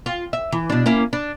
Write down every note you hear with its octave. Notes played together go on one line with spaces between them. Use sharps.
F4
E5
E3
B2 D4
A#3 C#4 E4
D4